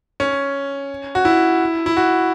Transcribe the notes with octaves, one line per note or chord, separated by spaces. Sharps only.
C#4
F#4
E4
E4
F#4